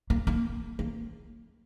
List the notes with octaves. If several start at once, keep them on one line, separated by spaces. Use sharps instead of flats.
A#3
A#3
A#3